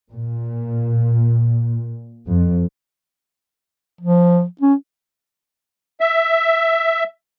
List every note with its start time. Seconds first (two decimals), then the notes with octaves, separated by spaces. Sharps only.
0.11 A#2
2.30 F2
4.01 F3
4.61 C#4
6.00 E5